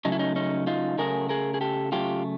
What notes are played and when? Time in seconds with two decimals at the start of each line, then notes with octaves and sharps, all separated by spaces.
0.05 C#3 F#3 A3 D#4
0.12 E4
0.19 C#4 D#4
0.36 C#4 D#4
0.67 D#4 F4
0.98 C#3 F#3 A3 G#4 A#4
1.29 G#4 A#4
1.54 G#4
1.61 G4 A4
1.92 C#3 F#3 A3 F4 G4